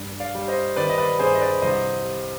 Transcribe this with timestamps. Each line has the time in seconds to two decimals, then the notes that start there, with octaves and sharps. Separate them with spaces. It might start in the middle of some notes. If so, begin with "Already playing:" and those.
Already playing: G2
0.20 D5 F5
0.35 G3
0.48 C5 D#5
0.76 D#3 B4 D5
0.90 D#5
0.98 B4 D5
1.19 G2 G#4 C5
1.35 D#5
1.41 B4 D5
1.62 C2 C5 D#5
2.05 G3